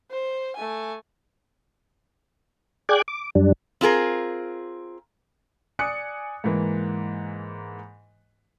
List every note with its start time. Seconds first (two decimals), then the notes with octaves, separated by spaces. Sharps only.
0.11 C5
0.56 A3 G#5
2.89 G#4 D5 G5 D6 F#6 G#6
3.08 D6
3.35 F#2 G3 D4
3.81 C4 F4 G#4 A#4
5.79 D5 G#5 D6 D#6 F#6 C#7
6.44 G#2 E3 A#3